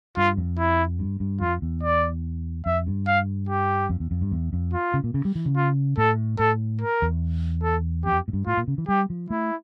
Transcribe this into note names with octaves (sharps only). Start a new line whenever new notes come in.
G2 F4
F2
E4
G2
G2
F2 F4
E2
D5
F2 E5
G2
F5
G4
F2
E2
F2
G2
E2
F2
F4
C#3
A#2
C#3
G3
E3
C#3
F4
A2 A4
A2 A4
A#4
E2
A4
F2 G4
A2
G2
A2 F4
A#2
C#3
E3
G3 G4
F3
A3 E4